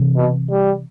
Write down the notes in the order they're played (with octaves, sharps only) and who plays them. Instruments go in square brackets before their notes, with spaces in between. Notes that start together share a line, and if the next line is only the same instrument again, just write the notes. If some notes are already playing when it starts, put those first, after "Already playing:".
Already playing: [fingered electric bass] C3 E3
[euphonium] B2
G3